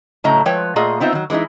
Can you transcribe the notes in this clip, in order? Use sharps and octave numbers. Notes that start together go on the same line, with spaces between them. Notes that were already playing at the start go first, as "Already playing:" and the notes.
A2 C#3 F#3 A3 D#5 A#5
F3 G#3 B4 C#5 G5
A#2 A3 F4 G#4 D#5 F#5
B3 C4 D#4 F4 E5
D#3 F#3
E3 G#3 C4 D#4 E4